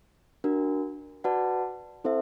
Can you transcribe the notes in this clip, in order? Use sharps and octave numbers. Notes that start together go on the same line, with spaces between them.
D4 F#4 A#4
F#4 B4 D5 F#5 A5
C4 E4 A4 C5 E5